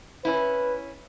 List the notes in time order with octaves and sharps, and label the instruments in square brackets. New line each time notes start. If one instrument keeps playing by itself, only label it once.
[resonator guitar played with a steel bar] C#4 E4 [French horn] B4